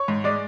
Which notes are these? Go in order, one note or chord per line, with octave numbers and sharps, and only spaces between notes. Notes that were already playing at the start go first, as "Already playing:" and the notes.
Already playing: C#5 C#6
G#2
G#3 D5 D6